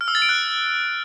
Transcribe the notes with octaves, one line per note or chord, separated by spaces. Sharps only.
F6
E6
A6
D7
F#6